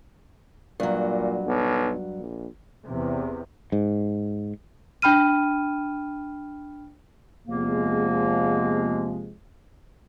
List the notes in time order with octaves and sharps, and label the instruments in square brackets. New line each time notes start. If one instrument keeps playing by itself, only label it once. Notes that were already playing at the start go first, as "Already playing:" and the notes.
[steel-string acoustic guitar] G2 F#3 [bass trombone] A#2
[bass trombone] B1
A#1
[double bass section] E2 C3
[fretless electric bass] G#2
[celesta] D4 G5 B5 F6 D#7
[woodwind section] E2 A#3 [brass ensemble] C3 F3 G#3